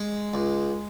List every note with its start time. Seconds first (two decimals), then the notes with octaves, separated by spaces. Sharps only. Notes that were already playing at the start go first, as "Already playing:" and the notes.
Already playing: G#3
0.34 C#2